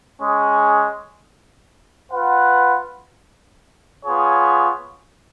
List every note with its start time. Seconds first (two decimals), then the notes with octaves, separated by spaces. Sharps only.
0.20 G#3 C#4 G#4
2.11 F4 B4 F#5
4.04 B3 F4 G#4 C#5